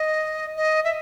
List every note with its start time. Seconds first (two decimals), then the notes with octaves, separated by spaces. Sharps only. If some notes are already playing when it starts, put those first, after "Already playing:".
Already playing: D#5
0.56 D#5
0.84 E5